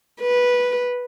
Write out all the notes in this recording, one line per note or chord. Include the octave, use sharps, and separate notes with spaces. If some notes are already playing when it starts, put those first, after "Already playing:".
B4